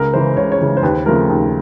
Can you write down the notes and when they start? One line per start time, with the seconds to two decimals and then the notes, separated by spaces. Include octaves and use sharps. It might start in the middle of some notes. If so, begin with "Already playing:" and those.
Already playing: C#2 A#4
0.14 C#3 E3 G#3 C5
0.37 C#2 C#5
0.52 C#5
0.60 C#3 E3 G#3
0.77 C5
0.83 D#2 B4
1.06 C#3 F3 A3 A#4
1.30 D#2